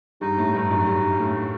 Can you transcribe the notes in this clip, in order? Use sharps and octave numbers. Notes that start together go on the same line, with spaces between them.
G2 G3 D#4
A2 A3
G2 G3 D#4
F#2 F#3
G2 G3
A2 A3